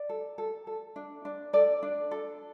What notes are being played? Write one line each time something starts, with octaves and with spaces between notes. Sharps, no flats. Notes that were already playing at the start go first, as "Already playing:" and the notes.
Already playing: D5
A4
A4
A4
D4
D4
A4 D5
D4
A4